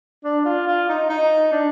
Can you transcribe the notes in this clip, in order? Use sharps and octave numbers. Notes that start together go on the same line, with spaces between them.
D4
F4
F4
D#4
D#4
D4